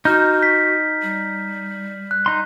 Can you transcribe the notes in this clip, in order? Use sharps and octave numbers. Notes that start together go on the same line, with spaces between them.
D#4 F#4 F6 G6
F6 B6
G3
F#6
D#4 C6